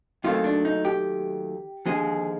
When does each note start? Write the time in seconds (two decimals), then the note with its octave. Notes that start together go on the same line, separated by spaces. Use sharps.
0.24 D#2 D#3 F#3 A3 C4 F4
0.44 D4
0.65 D#4
0.85 G4
1.86 D#2 D3 F3 G#3 G#4